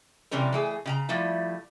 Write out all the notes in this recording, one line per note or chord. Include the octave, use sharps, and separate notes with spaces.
C3 E3 G3 C#4 A#4
E3 A3 G#4
C#3 G4 A#5
F3 G3 A3 E4